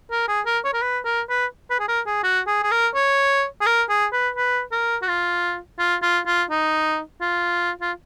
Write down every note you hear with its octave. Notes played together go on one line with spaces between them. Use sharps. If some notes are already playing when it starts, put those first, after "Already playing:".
A#4
G#4
A#4
C#5
A#4
B4
A#4
B4
B4
G#4
A#4
G#4
F#4
G#4
G#4
A#4
C#5
G#4
A#4
G#4
B4
B4
A#4
F#4
F4
F4
F4
F4
D#4
F4
F4